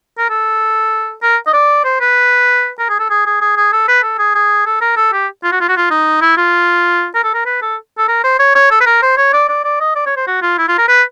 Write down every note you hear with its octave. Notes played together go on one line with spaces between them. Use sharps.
A#4
A4
A#4
D#5
D5
C5
B4
A#4
G#4
A4
G#4
G#4
G#4
G#4
A4
B4
A4
G#4
G#4
A4
A#4
A4
G4
F4
F#4
F4
F#4
F4
D#4
E4
F4
A#4
A4
A#4
B4
A4
A4
A#4
C5
C#5
C#5
A4
B4
A#4
C5
C#5
D5
D5
D5
D#5
D5
C#5
C5
F#4
F4
E4
F4
A#4
B4